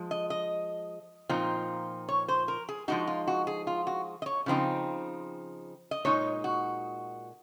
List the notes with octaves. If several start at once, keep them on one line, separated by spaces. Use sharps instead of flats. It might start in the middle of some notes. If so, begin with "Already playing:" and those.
Already playing: F3 G#3
D#5
D#5
A#2 F3 C4 D#4
C#5
C5
A#4
G#4
F3 G#3 D#4 F#4
F4
F#4
G#4
F4
F#4
D#5
C#5
C#3 F3 C4 D#4
D#5
A#2 G#3 D#4 C#5
F#4